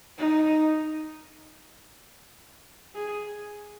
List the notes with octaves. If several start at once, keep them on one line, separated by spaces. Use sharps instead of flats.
D#4
G#4